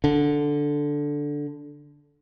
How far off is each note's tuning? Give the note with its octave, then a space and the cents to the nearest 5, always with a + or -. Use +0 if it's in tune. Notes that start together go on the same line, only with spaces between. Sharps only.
D3 -5